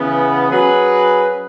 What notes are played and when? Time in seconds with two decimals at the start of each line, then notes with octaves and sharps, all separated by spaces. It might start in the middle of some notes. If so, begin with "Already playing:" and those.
Already playing: C#3 E3 B3
0.50 F#3 C#4 G#4 B4